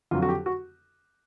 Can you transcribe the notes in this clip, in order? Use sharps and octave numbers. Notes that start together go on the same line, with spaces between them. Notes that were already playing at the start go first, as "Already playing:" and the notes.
F2 D3 F#3 F4
F#4
G4
F#4